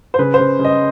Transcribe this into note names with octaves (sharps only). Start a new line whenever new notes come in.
C5
C#3 B4
C5
C#3
C#3
D#5